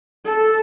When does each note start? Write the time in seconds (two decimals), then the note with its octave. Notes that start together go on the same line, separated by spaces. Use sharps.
0.25 A4